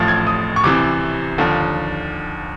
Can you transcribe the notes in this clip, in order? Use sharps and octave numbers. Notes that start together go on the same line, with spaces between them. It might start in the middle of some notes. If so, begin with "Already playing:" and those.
Already playing: A1 A2 F3 A6
G#6
D#6
C#6
C2 C3 E3 D6
D#2 D3 F3